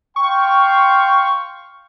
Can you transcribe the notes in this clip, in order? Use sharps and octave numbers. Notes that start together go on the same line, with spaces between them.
F5 G5 C6 C#6